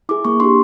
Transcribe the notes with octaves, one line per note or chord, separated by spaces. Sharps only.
E4 G#4 D6
A#3 C#6
D4 G4 C6